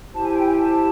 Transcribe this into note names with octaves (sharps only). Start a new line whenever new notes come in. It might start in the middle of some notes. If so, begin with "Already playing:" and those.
E4 G4 C5 A5
G#5
G5
G#5
A5